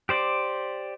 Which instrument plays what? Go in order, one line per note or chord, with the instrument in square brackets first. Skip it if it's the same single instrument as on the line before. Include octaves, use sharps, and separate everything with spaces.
[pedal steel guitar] G4 C5 D5